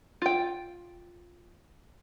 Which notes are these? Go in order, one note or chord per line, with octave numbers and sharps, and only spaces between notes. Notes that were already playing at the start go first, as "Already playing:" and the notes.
F4 G5